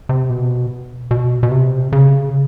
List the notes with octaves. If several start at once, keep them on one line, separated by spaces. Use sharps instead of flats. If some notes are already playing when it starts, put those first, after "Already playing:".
C3
B2
B2
B2
C3
C#3